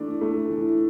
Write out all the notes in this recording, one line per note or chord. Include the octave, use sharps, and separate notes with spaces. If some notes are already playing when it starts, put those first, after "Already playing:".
Already playing: E3 A3 D4
A3
E3